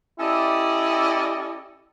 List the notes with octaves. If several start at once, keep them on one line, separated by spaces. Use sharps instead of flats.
C#4 E4 G4 A4 D5 D#5